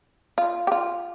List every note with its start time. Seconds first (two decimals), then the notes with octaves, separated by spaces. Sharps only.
0.38 F4
0.67 G4
0.72 F4